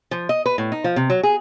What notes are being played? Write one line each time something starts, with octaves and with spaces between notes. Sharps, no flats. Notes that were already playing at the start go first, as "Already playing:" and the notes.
F3
D#5
B4
A2
D#4
F3
C3
F#3
G#4